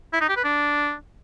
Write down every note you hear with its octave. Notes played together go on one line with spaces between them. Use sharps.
E4
D#4
G4
B4
D4